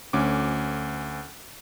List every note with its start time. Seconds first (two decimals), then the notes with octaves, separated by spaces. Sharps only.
0.13 D2 C#4 D6